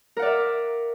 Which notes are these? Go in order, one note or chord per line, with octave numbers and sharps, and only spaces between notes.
A#4 D5 E5 F#5